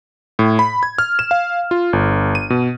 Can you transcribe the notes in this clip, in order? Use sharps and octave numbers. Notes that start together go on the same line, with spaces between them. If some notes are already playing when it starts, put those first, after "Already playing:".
A2
B5
G#6
F6
E7
F5
F4
G1
D#7
B2